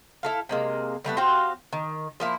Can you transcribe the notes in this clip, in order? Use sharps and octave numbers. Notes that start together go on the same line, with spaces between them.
E4 A4 F5
C3 G#3 A#3
D3 G3 A3 B3
C4 F#4 G4 F5
D#3
F3 A#3 E4